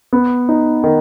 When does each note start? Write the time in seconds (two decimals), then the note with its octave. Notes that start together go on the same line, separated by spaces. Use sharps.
0.13 B3
0.49 D#4
0.84 D#3